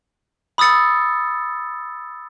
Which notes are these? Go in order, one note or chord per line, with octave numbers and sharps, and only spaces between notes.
B5 D#6 E6 A6 C#7